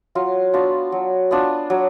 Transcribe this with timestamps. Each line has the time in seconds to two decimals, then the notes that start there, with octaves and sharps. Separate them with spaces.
0.15 F#3 F4
0.53 B3 D4 F4 F#4
0.92 F#3
1.31 B3 D4 F4
1.70 F#3